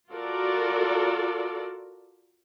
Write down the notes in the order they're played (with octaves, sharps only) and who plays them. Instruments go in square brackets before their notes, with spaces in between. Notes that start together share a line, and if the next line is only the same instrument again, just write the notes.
[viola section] F4 F#4 A4 A#4 D5